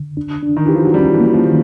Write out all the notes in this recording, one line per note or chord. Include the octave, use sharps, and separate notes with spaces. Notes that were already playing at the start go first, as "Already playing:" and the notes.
Already playing: D3
D4
D4
D#3
E3 G4
F3
F#3
G3 C#4
E3
A#3
F3
D#3